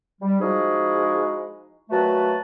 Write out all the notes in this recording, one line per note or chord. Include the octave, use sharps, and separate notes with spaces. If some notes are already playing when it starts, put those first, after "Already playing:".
G3
F3 G#3 D#4 E4 F#4 G#4
A#2 F#3 A3 F#4 B4 A5